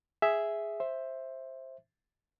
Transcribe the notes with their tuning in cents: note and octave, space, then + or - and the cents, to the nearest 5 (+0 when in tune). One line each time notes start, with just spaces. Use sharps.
G#4 +0 E5 +0
C5 +10 E5 +0